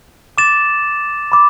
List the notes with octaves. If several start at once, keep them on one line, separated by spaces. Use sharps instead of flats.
D6 A6 E7
B5 D6